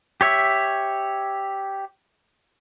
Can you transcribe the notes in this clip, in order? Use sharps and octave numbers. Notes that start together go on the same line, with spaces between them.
G4 C#5 E5